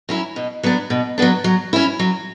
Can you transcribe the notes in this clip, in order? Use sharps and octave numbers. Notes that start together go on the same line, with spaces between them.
F#3 C#4 E4
B2
F#3 B3 D4
B2
F#3 B3 D4
F#3
C#4 E4
F#3